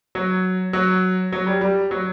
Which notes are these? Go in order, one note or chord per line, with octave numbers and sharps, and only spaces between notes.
F#3
F#3
F#3
G3
G3
F#3